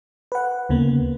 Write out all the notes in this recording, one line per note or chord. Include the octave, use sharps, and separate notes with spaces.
B4 F#5
D2 C#3 A#3 B3